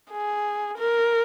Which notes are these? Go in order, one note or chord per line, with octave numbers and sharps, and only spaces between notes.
G#4
A#4